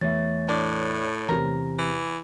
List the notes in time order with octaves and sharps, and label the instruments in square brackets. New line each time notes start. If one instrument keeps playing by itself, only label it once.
[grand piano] E2 E5 [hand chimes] A3 C#5 A6
[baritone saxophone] A2 [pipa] D4
[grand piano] E2 C3 [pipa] A#4
[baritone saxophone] E3